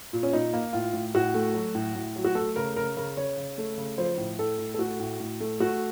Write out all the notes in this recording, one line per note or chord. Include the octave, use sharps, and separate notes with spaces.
A#2
C#4
A#2 D#4
A#3
A2 F4
A2
A2 F#4
A3
F#3
A2
A2
F#3
F#4
A3 A4
C#3 A#4
C#3 A#4
C#3 A#4
C#3 C#5
C#3
A3
C#3
F3 C5
A2
A2 A4
A2
A4
A3 F#4
A2
A2
A3
A3 F#4